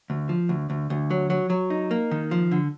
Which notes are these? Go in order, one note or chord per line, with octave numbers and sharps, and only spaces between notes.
D2
F3
D2
D2
D2
F#3
F#3
F#3
D#4
A#3
D#3
F3
D3